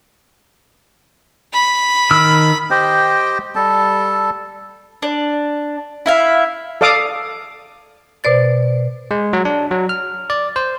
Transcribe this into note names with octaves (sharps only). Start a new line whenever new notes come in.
B5
D#3 E6 F6
G4 C5 D#5 G5
G3 A4 A5
D4
E4 E5 F5
A4 D5 F5 D6 D#6
B2 C5 D5 A6
G#3
F#3
D4
F#3
F6
D5
C5